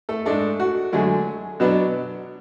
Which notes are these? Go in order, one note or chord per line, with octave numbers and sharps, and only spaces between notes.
A3 A4
G#2 G#3 A3 D4 A4
F#4
D3 F#3 G#3 A3 G#4
B2 F#3 B3 D4